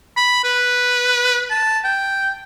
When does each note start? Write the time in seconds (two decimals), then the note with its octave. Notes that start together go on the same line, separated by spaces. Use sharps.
0.17 B5
0.44 B4
1.50 A5
1.84 G5